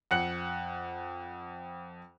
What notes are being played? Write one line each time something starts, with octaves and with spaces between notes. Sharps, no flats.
F2 F#5 F#6 C#7 F#7